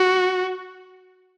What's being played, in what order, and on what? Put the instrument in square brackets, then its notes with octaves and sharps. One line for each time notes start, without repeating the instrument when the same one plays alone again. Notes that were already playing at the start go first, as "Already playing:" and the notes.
Already playing: [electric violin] F#4